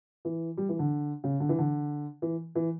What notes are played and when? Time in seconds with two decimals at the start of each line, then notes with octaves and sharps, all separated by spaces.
0.25 E3
0.57 G3
0.69 E3
0.79 D3
1.24 C#3
1.40 D3
1.49 E3
1.58 D3
2.22 E3
2.55 E3